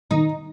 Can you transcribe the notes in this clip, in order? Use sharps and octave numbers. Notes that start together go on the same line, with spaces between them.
D#3 D#4